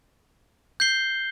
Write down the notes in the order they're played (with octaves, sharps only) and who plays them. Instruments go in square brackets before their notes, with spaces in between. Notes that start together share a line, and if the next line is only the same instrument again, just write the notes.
[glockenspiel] G6 C7 G7